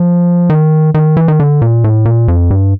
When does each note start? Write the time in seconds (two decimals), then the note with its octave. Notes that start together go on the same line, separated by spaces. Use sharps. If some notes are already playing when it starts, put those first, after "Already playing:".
Already playing: F3
0.50 D#3
0.94 D#3
1.17 E3
1.28 D#3
1.40 D3
1.62 A#2
1.84 A2
2.05 A#2
2.28 F2
2.51 G2